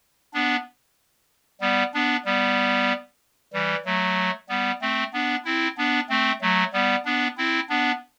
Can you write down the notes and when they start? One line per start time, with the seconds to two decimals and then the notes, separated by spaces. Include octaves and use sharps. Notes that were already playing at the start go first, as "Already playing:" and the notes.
0.34 B3 D4
1.61 G3 B3
1.94 B3 D4
2.25 G3 B3
3.53 E3 G3
3.85 F#3 A3
4.49 G3 B3
4.81 A3 C4
5.13 B3 D4
5.45 C4 E4
5.77 B3 D4
6.09 A3 C4
6.41 F#3 A3
6.73 G3 B3
7.05 B3 D4
7.37 C4 E4
7.69 B3 D4